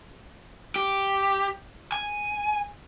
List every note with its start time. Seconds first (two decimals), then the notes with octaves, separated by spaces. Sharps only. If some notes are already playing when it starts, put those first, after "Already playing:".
0.76 G4
1.92 G#5